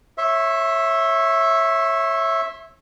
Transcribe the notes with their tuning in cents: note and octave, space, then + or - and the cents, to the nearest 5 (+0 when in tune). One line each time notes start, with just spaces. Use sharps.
C#5 -20 E5 +0 C6 +35